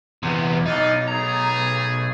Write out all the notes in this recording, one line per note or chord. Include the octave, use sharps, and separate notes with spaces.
E2 C3 B3
B1 D#4 D5 F5
A3 G#4 A#5